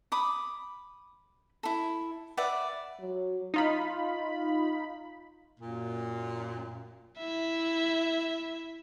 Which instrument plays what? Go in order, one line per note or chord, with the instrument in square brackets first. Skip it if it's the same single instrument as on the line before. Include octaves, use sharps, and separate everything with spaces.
[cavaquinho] B5 D6 D#6
E4 A4
B4 D5 E5 F#5
[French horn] F#3
[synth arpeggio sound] D#4 F4 B5
[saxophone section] F#2 A#2
[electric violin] E4 E5